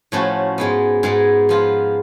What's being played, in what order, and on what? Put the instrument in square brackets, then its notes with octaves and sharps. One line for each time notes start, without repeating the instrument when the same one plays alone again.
[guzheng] A2 F3 A3 C#4 F#4
G#2 G#3 B3
G#2 G#3 B3
F3 B3 F4